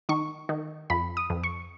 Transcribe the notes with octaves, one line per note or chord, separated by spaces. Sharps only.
D#3 C#6
D#3
F2 B5
D#6
F2
C#6